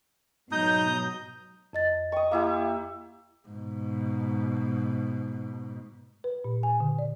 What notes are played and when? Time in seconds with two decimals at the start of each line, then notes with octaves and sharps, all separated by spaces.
0.52 G#2 B2 F#3 D#4 A#5 D#6 G6
1.73 F2 D#5 A6
2.12 D#5 G5 C#6 D#6
2.31 A#3 E4 G4
3.48 G#2 B2
6.24 B4
6.44 A#2
6.63 G#5
6.80 D3
6.99 D5